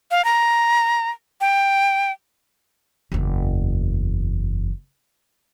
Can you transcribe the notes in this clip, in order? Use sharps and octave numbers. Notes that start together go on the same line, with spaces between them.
F5
A#5
G5
F#1 E2